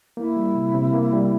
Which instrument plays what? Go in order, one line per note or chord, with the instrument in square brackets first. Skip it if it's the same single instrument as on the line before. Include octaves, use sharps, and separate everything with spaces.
[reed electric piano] A#3 [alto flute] E4
[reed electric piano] G3
C3
C3
A#3
G3